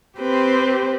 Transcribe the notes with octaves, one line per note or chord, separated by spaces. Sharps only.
C4 G4 B4 C5